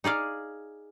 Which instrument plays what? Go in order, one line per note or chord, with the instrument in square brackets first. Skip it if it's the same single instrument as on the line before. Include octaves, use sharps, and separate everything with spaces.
[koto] D#4 G#4 D5 F5